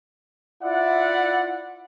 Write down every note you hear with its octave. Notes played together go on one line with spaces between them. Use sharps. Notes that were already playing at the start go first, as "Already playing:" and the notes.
E4 F4 D5 E5 F#5